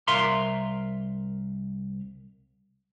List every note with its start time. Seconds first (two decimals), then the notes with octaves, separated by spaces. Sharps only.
0.08 C2 A#4 E5 F5 A#5 C6